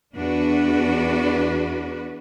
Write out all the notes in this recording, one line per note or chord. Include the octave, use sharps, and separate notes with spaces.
E2 D4 F#4 B4